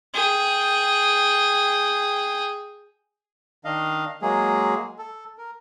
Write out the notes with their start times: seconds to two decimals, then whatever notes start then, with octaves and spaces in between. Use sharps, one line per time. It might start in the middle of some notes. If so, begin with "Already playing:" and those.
0.14 G#4 G5
3.65 D#3 D4 D#5 F5
4.22 F#3 G#3 A#3 G#4
4.98 A4
5.38 A#4